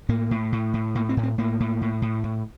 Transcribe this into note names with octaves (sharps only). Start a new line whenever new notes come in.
A2 A#3
A2
A2
A2
A2 A#3
C4
A2
C4
A2 A#3
A2
A2
A2
A2